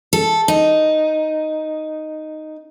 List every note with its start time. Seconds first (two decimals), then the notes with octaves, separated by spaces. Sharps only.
0.13 A4
0.48 D#4